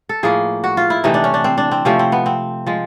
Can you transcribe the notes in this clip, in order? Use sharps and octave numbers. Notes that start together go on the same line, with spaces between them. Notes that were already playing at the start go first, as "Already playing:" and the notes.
A4
A2 F3 A#3 G#4
F#4
F4
E4
C3 E3 A3 D#4
D4
C#4
D4
C4
D4
C4
C3 F3 A3 C#4
C4
B3
C4
F3 G#3